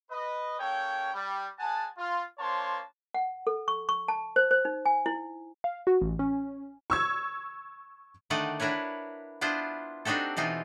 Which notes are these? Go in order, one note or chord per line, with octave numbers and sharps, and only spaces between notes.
B4 D#5
A#3 C#4 A4 C#5 G5
G3
G#3 F#5 G#5 A5
F4
A#3 D4 C5 C#5 A5 C6
F#5
A4
C#6
C#6
A5
C5
C5
D#4
G#5
E4
F5
F#4
A1
C#4
C#6 E6 G#6
D3 D#3 A3 D#4 D5 F#5
D4 E4 A#4 B4 C#5
B3 D4 E4 F4 C5
C4 D4 D#4 F#4 G4 A4
B2 E3 C4 D#4 F4